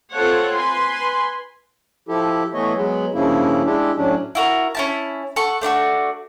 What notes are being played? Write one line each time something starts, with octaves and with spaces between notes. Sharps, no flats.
C4 F4 A4 C#5 F#5
B4 G#5 C6
F3 E4 G4 A4
E3 A3 B3 C#5 D#5
F#3 G#3 B3
G2 C#3 F3 A#3 C#4 E4
G#3 D4 E4 G4
A2 F#3 C#4 D4
E4 F#4 A#4
C#4 E4 A5
A4 F#5 C#6
A3 D4 E4 F#4